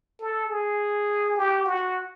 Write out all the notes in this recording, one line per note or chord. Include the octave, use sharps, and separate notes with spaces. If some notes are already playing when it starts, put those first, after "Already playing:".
A4
G#4
G4
F#4